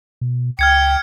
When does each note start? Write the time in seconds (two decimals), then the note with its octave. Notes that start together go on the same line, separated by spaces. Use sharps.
0.21 B2
0.59 C#2 G5 F6 G#6 C#7